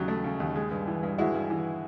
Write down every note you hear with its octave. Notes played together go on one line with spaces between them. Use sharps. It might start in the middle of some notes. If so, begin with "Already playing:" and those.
Already playing: D#2 C#3 F#3
A3
C#3
D#2
G#3
G2
E3
G2
G#3 E4 F#4
G2
E3